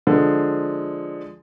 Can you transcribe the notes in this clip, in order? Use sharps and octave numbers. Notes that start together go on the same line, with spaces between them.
D3 F3 G#3